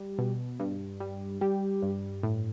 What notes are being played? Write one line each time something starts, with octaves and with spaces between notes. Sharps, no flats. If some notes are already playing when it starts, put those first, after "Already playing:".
Already playing: G3
B2
G2
G3
G3 G4
G2
A2